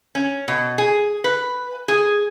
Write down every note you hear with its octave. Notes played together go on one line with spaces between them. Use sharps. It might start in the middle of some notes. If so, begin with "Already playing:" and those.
C#4
B2
G#4
B4
G#4